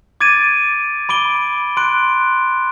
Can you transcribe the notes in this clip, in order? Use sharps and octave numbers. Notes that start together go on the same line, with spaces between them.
D6 G#6 A6 D7 D#7
B5 D6 D7 G7
C6 F#6 D7